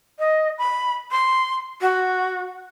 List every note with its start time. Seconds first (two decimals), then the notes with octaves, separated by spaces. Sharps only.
0.19 D#5
0.58 B5
1.11 C6
1.81 F#4